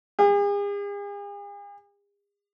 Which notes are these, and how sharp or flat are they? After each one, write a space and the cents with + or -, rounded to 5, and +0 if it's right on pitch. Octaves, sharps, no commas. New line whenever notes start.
G#4 -45